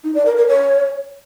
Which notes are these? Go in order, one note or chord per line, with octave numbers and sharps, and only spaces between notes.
D#4
D5
A#4
A#4
C#5